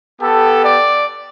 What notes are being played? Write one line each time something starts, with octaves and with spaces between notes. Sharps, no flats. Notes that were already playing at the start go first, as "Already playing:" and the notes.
B3 G4 A4
D5